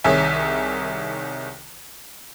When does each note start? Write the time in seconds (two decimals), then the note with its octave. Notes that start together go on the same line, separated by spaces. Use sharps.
0.04 C2 D#3 G#4 C#5 E5 G#5